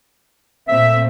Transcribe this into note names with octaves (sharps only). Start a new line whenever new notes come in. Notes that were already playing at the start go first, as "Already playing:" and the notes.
A#2 A3 C4 E5